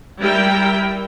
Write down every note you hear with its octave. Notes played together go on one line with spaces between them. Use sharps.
G3 E4 A#4 G5